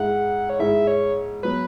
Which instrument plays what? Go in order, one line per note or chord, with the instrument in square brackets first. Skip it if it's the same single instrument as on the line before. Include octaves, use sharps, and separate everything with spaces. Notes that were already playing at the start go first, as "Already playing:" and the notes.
Already playing: [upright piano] G#2 G#3 E4 [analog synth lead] F#5
[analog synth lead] C#5
[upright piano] G#2 G#3 E4 [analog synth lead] E5
[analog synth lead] C#5
[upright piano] F#3 B3 [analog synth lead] B4